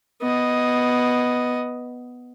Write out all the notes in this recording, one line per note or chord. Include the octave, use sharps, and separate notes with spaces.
B3 D#5